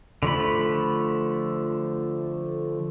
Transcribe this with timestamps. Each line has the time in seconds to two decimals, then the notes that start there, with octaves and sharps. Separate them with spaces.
0.23 D3 F3 A3 B5